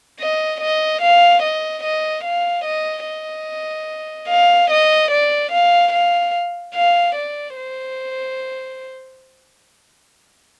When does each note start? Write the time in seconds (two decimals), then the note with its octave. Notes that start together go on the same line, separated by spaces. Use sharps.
0.20 D#5
0.61 D#5
1.02 F5
1.43 D#5
1.83 D#5
2.24 F5
2.65 D#5
3.06 D#5
4.29 F5
4.70 D#5
5.11 D5
5.52 F5
5.92 F5
6.75 F5
7.15 D5
7.56 C5